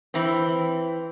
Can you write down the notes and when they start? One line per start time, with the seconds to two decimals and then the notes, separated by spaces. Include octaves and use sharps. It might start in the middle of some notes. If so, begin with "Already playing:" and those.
0.14 E3 C4